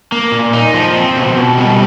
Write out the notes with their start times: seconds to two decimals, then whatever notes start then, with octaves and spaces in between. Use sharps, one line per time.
0.12 A#3
0.32 A#2
0.53 D#4
0.74 F3
0.95 C4
1.17 B2
1.37 B2
1.58 G3